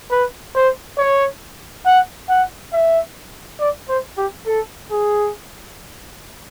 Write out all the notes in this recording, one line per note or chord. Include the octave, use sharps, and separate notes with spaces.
B4
C5
C#5
F#5
F#5
E5
D5
C5
G4
A4
G#4